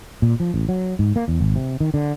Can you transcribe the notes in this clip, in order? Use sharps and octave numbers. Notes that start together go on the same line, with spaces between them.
A#2
F3
A1
F#3
G#2
A#3
E2
G#1
C3
D#3
D3